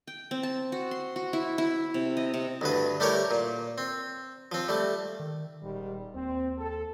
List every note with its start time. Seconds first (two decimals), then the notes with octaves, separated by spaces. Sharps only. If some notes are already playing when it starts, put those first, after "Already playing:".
0.07 G5
0.31 C4
0.43 A5
0.72 F#4
0.91 C6
1.16 F#4
1.33 E4
1.58 E4
1.94 C3
2.17 D#5
2.34 C3
2.61 D2 G2 B4
3.00 G3 A3 E4 G4 A#4 C#5
3.31 A#2
3.78 C4
4.52 F3 C4
4.68 G3 A3
5.20 D#3
5.63 D#1 G#2 D#3 G3
6.15 D#2 C4
6.58 A4